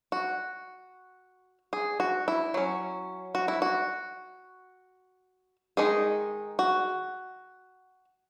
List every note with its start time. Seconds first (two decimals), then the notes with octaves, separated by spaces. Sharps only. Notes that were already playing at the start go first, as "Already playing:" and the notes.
0.12 F#4
1.73 G#4
2.00 F#4
2.28 E4
2.54 F#3 C#4
3.35 F#4
3.48 E4
3.62 F#4
5.77 D#3 G#3 D#4 G#4
6.59 F#4